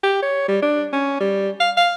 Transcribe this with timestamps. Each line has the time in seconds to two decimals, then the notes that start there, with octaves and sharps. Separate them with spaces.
0.03 G4
0.23 C#5
0.48 G3
0.62 D4
0.93 C#4
1.20 G3
1.60 F5
1.77 F5